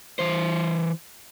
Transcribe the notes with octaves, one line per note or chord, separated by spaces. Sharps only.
E3 C5